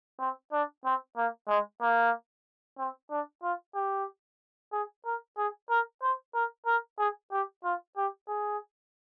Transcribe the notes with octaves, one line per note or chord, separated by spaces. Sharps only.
C4
D4
C4
A#3
G#3
A#3
C4
D4
F4
G4
G#4
A#4
G#4
A#4
C5
A#4
A#4
G#4
G4
F4
G4
G#4